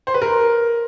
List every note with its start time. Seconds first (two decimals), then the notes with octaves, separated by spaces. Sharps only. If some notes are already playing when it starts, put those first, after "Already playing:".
0.07 C5
0.14 B4
0.22 A#4